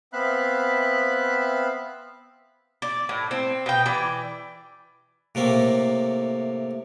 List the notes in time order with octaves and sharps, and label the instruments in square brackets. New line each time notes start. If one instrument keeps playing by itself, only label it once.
[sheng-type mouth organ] B3 C4 E5 F5 B5 F#6
[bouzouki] D5
A2
C4
B2 G5
E3 D5
[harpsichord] A2 C3 A3 A#3